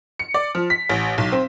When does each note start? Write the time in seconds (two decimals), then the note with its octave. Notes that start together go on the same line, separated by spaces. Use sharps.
0.19 C#7
0.34 D5
0.55 F3
0.70 B6
0.90 A1
1.18 B1
1.32 C4